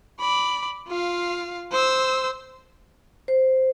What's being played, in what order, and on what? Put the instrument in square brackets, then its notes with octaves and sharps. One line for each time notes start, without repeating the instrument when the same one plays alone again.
[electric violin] D5 B5
F4 F5
C5 E6
[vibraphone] C5